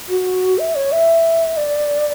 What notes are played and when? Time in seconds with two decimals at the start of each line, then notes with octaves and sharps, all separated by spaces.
0.09 F#4
0.59 E5
0.75 C#5
0.92 E5
1.57 D5